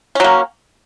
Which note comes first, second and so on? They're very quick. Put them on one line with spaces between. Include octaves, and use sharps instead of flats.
C#4 F#3 A#3